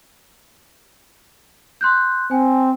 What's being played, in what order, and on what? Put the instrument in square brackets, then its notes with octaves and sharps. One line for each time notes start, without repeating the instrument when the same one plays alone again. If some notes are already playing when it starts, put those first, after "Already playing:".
[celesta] C6 F#6 G6
[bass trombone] C4 [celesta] G#5